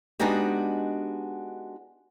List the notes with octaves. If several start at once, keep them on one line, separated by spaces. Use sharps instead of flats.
G#3 B3 D4 D#4 F#4 G4